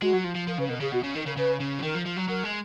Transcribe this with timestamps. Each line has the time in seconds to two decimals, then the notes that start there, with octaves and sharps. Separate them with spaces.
0.02 G#3 F#4
0.13 F#3
0.24 F3
0.36 F3
0.47 F3 A#4
0.59 C#3 B4
0.69 B2 A#4
0.81 C#3 G#4
0.92 B2 F#4
1.04 C#3
1.15 D#3 A#4
1.26 C#3 A#4
1.37 C#3 B4
1.60 C#3
1.79 F3
1.83 D#3 A#4
1.95 F3
2.05 F3
2.17 F#3
2.28 F#3 A#4
2.43 G#3